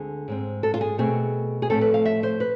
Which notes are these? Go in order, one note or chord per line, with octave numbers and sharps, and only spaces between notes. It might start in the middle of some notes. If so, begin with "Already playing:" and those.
Already playing: D2 D3 G#3 C4 G#4
G#2 G#3 C4
A4
F4
G#4
B2 A3 C4 G#4
G#4
A2 F3 A3 C4 A4
B4
F5
E5
C5
B4